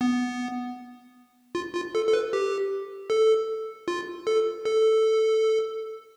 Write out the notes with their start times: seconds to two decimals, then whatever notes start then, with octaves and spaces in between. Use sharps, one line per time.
0.01 B3
1.55 F4
1.75 F4
1.95 A4
2.08 A4
2.13 B4
2.33 G4
3.10 A4
3.88 F4
4.27 A4
4.65 A4